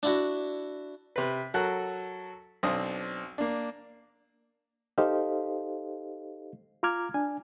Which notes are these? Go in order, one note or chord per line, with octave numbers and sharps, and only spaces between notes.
D4 E4 F#4
C3 B4
F#3 F#4 A4 A#4 F#6
B1 C4 D4 D#6
A#3 D4
D#4 G4 A4 C5 D#5 F5
F4 A#5 D6 F6 G#6
D4 G#5